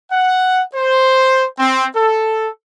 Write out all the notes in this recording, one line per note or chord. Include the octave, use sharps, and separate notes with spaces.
F#5
C5
C4
A4